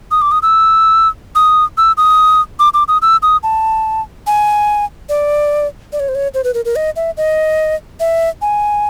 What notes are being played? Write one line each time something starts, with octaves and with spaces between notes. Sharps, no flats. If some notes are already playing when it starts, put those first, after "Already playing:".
D#6
D6
D#6
E6
D#6
E6
D#6
D6
D6
D#6
E6
D#6
A5
G#5
D5
D5
C#5
C5
C#5
C5
B4
A#4
A#4
D#5
E5
D#5
E5
G#5